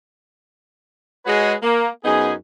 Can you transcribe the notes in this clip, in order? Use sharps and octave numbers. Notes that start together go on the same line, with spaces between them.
G#3 F#4 G#4 B4 C#5 D#5
A#3
F#2 B3 D#4 G#4